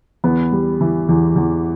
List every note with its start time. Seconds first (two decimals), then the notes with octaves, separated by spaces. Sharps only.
0.24 E2 B3
0.52 G3
0.81 E3
1.09 E2
1.36 E2